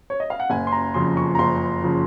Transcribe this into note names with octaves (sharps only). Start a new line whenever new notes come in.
C#5
D#5
F5
F#5
F#1 G#5
C6
A#5
F2 C#3 F3 C6
C#6
A#5
F#1 C6
C#3 F3